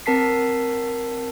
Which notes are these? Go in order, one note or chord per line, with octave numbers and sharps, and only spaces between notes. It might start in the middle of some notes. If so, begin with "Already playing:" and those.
C4 A#4 A5 B6 C7